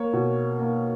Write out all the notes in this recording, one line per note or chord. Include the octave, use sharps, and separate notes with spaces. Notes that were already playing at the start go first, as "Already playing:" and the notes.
Already playing: A#3 C#5
B2
A#3